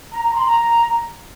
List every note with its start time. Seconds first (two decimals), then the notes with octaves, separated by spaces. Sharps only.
0.12 A#5
0.22 A#5
0.33 C6
0.44 A#5